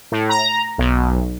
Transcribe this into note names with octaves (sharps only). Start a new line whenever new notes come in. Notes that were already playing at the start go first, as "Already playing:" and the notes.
A2
A#5
B1